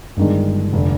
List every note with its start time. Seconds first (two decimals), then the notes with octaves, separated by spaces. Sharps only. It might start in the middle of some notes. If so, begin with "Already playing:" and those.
0.17 G1 G2 D#3 G#3 D4
0.73 F1 D3